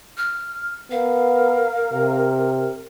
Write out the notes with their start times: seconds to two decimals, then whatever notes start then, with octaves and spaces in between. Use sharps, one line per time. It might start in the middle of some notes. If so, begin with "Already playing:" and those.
0.17 F6
0.91 B3 A#4 F5
1.93 C3